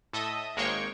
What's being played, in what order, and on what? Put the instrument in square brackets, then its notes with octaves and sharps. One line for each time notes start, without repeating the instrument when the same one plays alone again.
[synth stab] A2 A4 D#5 E5 D#6
G#1 G#3 A#3 C#5 G5 C#6